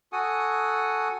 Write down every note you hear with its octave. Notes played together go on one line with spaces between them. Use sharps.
F#4 A4 F#5 G#5 D#6